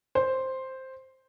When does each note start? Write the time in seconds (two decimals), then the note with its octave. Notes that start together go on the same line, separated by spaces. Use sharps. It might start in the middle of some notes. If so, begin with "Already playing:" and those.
0.15 C5